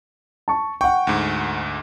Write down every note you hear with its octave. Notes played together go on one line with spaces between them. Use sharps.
A5 C#6
F#5 G5 C#6
D2 G#2